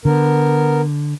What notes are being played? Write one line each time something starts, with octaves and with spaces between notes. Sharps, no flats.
D3 B3 A#4